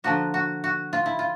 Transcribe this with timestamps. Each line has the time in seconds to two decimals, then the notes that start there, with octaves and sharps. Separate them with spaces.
0.04 D3 F3 A#3 F#4
0.34 F#4
0.64 F#4
0.93 F4
1.06 E4
1.19 F4